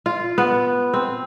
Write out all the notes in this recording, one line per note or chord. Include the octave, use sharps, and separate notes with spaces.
F4
B3
C4